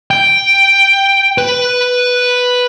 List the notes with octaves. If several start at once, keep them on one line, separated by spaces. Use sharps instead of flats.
G5
B4